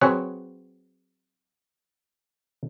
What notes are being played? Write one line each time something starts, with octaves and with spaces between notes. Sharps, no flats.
F#3 C4 G#4 B4 C#5 F#5